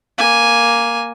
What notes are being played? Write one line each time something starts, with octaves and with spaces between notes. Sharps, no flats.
A#3 G#5